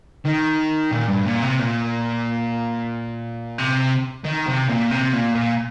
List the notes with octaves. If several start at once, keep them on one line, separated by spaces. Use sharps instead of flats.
D#3
A#2
G2
A#2
C3
A#2
C3
D#3
C3
A#2
C3
A#2
A#2